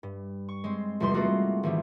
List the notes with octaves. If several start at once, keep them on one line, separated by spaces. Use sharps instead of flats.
G2
C#6
G#3 C4
F1 E2 C3 G3 C6
A3 A#3 F4 F#4 G#4
G#1 E3 G3